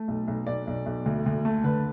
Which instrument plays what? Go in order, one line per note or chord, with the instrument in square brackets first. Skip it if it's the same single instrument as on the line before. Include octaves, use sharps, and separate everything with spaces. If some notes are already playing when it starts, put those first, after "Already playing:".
Already playing: [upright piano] A3
B1
B1
B1 D5
B1
B1
D2
D2
A3
D3 B4